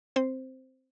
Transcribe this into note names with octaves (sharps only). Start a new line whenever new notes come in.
C4 C5